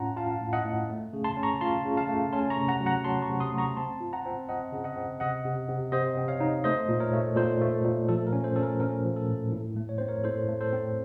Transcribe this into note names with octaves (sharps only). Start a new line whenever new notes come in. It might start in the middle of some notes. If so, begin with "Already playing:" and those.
Already playing: A2 C#4 F4 F#5 A5 A#5 C6
F4 F5 A5
A2
D#5 F#5
A2
A3
C#3
A5 C6
C#4
A#5 C#6
F4 A5 C6
C#3
F5 A5
A3
C#4 A5 C6
A#5 C#6
C3
F#5 A#5
F#3
F#5 A#5
F#3 A5 C6
A#5 C#6
C3
C6 D#6
A3
A#5 C#6
C4 A5 C6
F4
F#5 A#5
C4
C4 D#5 F#5
C#3
D#5 F#5
C4
C3 D#5 F#5
C3
C3
C3 C5 D#5
C4
C#5 F5
D#4
A3 C5 D#5
A#2
A#4 C#5
A3
A#2 A4 C5
A3
A#2
F3 A4
A#4
C#4
A4 C5
C#4 A4
A#4
C#4 A#4
F3
A4
A2
A2
A3
C#5
C4 C5
A#4 C#5
A2 A4 C5
A3
A4 C5
C4